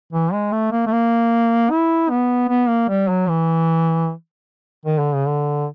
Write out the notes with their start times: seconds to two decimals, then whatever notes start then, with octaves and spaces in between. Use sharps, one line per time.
0.13 E3
0.33 G#3
0.52 A3
0.72 A#3
0.87 A3
0.92 A#3
1.71 E4
2.10 B3
2.49 B3
2.69 A#3
2.89 G3
3.09 F#3
3.29 E3
4.85 D#3
4.99 D3
5.14 C#3
5.27 D3